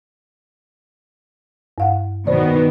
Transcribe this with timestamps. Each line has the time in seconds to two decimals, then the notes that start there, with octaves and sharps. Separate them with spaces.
1.78 G2 F5 F#5
2.27 B2 D#3 B3 C5 D5